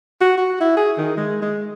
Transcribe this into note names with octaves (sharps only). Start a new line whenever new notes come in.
F#4
F#4
E4
G#4
D#3
G#3
G#3